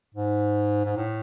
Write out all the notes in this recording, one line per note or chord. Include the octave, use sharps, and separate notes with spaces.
G#2
G#2
A2